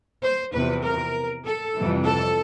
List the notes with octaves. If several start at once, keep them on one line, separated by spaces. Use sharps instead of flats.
C5
E2 C3 F3 B4
A#4
A4
F2 C3 E3 G3
A4